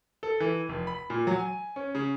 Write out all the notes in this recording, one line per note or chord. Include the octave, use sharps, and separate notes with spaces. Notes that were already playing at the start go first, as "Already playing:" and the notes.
A4
E3
F1
B5
A#2
F#3
G#5
C#4
C#3